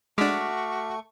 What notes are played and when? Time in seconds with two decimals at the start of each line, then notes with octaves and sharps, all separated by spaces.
0.18 G#3 A3 D4 F#4 C#6 D6 F6 B6